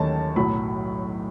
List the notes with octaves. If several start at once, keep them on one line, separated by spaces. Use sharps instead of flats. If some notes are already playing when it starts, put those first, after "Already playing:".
Already playing: D#2 D#3 F#3 A3 C#4 C#5 A5
B1 A2 F#3 B5